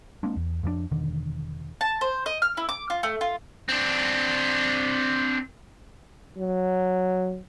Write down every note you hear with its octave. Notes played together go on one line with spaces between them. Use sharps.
G#3 A#3 C4 D4
E2
F2 F3 F#3 D4
E1 D3 D#3
A5
C5
D#5
F6
E4
D6
F4
A3
F4
C4 D4
F#3